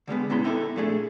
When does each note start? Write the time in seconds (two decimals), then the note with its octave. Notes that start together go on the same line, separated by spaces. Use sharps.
0.07 D3 G3 G#3 B3
0.30 A#2 B3 C#4 E4 A#5 C6
0.44 C4 D#4 E4 G4 A4
0.76 A#2 F3 A3 D4 G#4